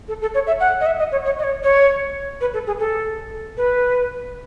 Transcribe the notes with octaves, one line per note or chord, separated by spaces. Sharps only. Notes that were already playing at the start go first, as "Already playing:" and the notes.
A4
A4
C#5
E5
F#5
D#5
E5
D#5
C#5
C#5
D#5
C#5
C#5
B4
A4
G#4
A4
B4